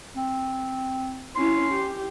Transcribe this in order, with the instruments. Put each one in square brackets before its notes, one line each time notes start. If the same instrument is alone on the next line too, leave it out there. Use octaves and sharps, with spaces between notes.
[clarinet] C4
[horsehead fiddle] C#4 E4 [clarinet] C6
[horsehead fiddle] G4